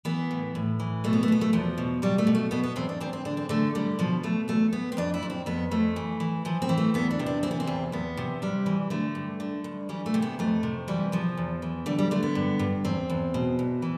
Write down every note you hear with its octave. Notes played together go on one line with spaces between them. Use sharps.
E3 B3
A2
A2
E3
B2 A3
B3
A3
B2 B3
A3
E2 F3
B2
B2 G3
A3
B2
A3
B2 B3
B3
E2 C4
D4
E2 C4
C4
D3 D4
C4
D3 A3
D3 G3
B2 F3
B2 A3
E2 A3
E2 B3
C4
F2 D4
E4
F2
C4
F2 B3
F2 A3
E3
E3
E3 F3
C4
E3
A3
E2 B3
D4
C3
D4
E3 C4
B3
C4
E2
E2 B3
C3
C3 G3
E3
D3 A3
G2
D3
G2
E3 G3
A3
C3
B3
F2 A3
C3
E3 G3
E2 F3
E2
E3
D3 G3
G3
D3 A3
B3
G2
G2
E2 C4
E2
B2
E2
E3